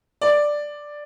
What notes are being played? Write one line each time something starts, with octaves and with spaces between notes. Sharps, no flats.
D5